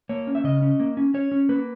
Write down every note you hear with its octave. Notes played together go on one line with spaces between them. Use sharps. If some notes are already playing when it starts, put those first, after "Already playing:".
A#3 C#5
C#4
E5
C#3 D#5
C#4
A#3
C#4
C#4 C#5
C#4
A#3 B4